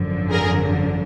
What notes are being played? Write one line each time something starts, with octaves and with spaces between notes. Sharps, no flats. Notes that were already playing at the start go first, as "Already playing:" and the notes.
Already playing: G#1 F#2 D3 F3
G#4 A#4